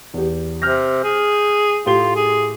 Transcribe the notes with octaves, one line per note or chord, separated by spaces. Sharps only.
E2 G4
C3 F6 G6 A#6
G#4
A2 F4 G4 G7
G#4